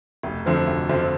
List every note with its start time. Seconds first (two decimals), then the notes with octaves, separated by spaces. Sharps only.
0.23 F1
0.46 F2 D3 F3 C4
0.67 F1
0.89 F2 D3 F3 C4